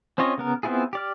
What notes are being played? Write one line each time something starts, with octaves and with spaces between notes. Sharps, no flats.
C4 C#4 F4 C#5 D#5
C#3 B3 A#4
B3 C4 E4 F4 G#4
G4 D5 F6